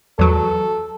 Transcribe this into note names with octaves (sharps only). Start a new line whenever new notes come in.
E2 F#3 A4